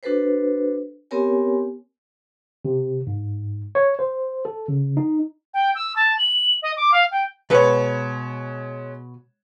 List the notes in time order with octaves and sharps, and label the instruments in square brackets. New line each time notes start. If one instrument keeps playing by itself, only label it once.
[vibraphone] D4 F#4 A4 B4 C5
B3 C4 G4 A#4 C#5 G#5
[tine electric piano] C3
G#2
C#5
C5
A4
C#3
D#4
[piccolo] G5
E6
A5
F#7
D#5
D6
F5
G5
[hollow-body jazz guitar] B2 B4 F#5 [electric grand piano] G#3 C#5